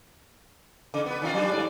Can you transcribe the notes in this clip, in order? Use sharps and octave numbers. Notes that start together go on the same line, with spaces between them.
C#3
B3 B4
D#3 C#4 F4
F#3 G3 D4
G#2 D5